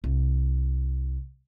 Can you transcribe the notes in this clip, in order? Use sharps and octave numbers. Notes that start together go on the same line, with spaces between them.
C2